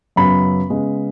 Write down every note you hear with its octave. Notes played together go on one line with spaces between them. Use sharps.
F#2 C#3 F#3 B3 B5
C#3 G#3 B3